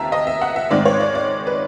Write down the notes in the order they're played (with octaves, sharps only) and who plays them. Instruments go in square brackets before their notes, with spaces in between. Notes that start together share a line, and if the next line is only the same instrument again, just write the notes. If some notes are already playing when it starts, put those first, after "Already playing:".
Already playing: [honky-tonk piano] D#2 D#3 E5 A5 A#5
D#5
E5
F#5
E5
G#2 D#3 G#3 C4 D5
C#5
D5
D5
B4